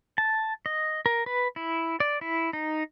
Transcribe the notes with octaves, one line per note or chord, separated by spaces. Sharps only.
A5
D#5
A#4
B4
E4
D5
E4
D#4